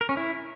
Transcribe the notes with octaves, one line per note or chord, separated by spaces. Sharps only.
A#4
C#4
E4